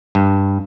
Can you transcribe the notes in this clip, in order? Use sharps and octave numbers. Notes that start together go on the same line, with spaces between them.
G2